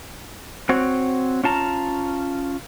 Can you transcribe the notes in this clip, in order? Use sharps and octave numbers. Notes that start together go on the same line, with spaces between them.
C4 F#4 C#5
C#4 F4 A5 A#5